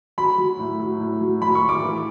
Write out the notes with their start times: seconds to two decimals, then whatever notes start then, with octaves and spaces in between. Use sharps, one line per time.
0.18 F#3 B5
0.38 F#3
0.59 A2
0.79 F#3
1.00 A2
1.21 F#3
1.41 F#3 B5
1.55 C#6
1.62 A2
1.69 D6
1.83 E3